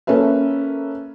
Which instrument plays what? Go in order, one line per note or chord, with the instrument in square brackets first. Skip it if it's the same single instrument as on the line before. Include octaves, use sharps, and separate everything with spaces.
[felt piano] A#3 C#4 A4 B4 E5